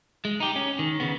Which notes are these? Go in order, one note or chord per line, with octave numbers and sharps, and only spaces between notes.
G#3
D#4 G4
C#4
D#3
C#3 B3